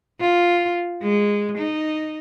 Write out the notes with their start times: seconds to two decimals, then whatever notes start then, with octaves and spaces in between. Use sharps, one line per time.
0.20 F4
1.02 G#3
1.58 D#4